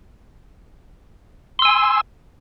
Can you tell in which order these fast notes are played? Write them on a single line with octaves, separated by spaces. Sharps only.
C6 E6 G#5